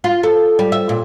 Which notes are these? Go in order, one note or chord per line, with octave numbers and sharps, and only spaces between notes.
F4
A4
G3
E5
A#2